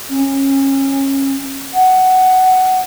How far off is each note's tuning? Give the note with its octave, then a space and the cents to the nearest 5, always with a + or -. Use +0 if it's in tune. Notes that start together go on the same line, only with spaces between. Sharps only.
C#4 -25
F#5 +10